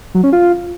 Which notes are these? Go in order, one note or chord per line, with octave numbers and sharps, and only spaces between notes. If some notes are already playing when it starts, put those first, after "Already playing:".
F#3
C#4
F4